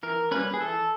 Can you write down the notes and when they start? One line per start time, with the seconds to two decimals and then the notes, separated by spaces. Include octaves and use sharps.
0.03 E3 A#4
0.31 G3 A#3 C#4 B4
0.54 G#4
0.60 E3 A4